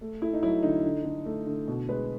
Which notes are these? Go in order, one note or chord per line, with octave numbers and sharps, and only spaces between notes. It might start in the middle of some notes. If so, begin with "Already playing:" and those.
A3
A3 E4
D#4
F#3 E4
D3 D#4
D3
D3
A3
D3
B2
G#3 B4